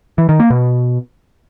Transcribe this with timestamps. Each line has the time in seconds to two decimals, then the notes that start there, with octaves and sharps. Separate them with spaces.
0.18 E3
0.29 D#3
0.40 A#3
0.50 B2